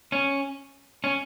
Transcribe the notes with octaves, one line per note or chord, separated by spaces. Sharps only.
C#4
C#4